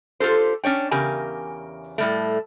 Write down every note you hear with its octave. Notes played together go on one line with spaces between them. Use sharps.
F4 G4 A4 C5
C#4 D4 C#5 G5
E2 C#3 G4 A#4 G#5
A2 G3 A3